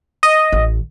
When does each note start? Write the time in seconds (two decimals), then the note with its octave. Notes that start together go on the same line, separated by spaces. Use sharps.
0.23 D#5
0.52 A1